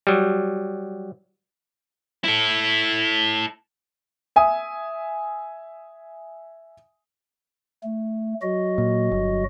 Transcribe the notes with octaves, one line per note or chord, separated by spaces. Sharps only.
F#3 G3
E4 A4
E5 G#5 D#6
A3
F#3 F#4 D#5
A#2
G1